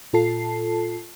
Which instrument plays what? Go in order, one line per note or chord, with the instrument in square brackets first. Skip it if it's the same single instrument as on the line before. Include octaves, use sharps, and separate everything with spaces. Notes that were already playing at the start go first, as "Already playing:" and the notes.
[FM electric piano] A#2 F4 A4 A5 C7